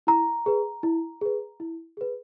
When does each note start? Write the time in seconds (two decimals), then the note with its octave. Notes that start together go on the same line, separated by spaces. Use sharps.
0.07 E4 A#5
0.46 G#4 B4
0.83 E4
1.21 G#4 B4
1.60 E4
1.97 G#4 B4